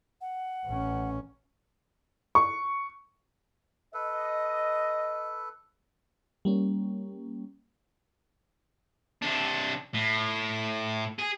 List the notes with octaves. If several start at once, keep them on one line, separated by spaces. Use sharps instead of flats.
F#5
A1 C#4
C#6
A4 B4 D#5
G3 A#3 C#4
C3 D4
A2
G#4